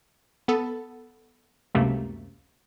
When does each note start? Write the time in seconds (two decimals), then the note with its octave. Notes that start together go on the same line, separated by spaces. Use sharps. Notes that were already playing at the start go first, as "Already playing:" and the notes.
0.48 B3 A4
1.75 C#2 F#2 C3 A3 A#3